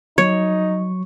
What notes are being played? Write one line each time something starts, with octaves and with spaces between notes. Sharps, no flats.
F#3 D#4 C#5 C#6